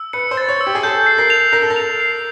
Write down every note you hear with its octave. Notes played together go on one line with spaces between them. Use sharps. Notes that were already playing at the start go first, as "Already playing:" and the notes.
Already playing: E6
B4 C#7
C5
A6
C#5
E6
G4
G#4
A4 G6
C7
A#4
F7
A#4 G6
A4
A#4
F7
C7